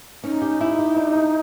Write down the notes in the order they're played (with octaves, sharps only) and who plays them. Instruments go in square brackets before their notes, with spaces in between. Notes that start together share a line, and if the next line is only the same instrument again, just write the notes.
[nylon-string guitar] C#4 [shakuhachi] D#4
[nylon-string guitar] G4
E4
G4
D4
D4